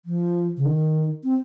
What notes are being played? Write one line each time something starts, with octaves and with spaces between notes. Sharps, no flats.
F3
C#3
D#3
C4